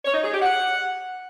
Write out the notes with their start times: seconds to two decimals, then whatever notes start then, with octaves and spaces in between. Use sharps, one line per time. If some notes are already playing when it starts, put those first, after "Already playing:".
0.05 C#5
0.14 D#4
0.23 G#4
0.33 G4
0.42 F#5